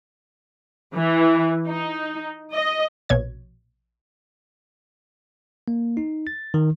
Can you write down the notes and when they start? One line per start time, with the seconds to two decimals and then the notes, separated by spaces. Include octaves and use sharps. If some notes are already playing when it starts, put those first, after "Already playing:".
0.95 E3
1.67 D#4
2.54 D#5
3.09 A#1 B2 C#5 G#6
5.68 A#3
5.97 D#4
6.27 A6
6.54 D#3